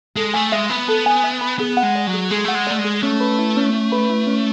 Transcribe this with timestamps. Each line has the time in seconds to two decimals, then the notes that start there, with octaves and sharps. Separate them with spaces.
0.16 G#3 A4
0.34 A3 G#5
0.52 G#3 E5
0.70 B3 B5
0.88 A4
1.06 G#5
1.23 E5
1.41 B5
1.59 B3 G#4
1.77 F#5
1.83 G#3
1.95 D5
2.07 F#3
2.13 G#4
2.31 G#3 G#4
2.44 A3 F#5
2.55 G#3
2.67 A3 D5
2.79 G#3
2.84 G#4
3.02 A3 C#4
3.20 B4
3.38 E4
3.56 C#4
3.73 C#4
3.92 B4
4.09 E4
4.27 C#4